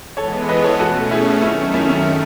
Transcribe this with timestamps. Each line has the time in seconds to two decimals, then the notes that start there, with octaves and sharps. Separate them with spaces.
0.17 E3 G#3 B3 A4 C#5
0.49 B4 D#5
0.64 A4 C#5
0.80 B2 A3 C#4 F#4 A4
1.11 E4 G#4
1.42 F#2 D#3 A3 C#4 E4
1.74 C#4 E4
1.89 C#4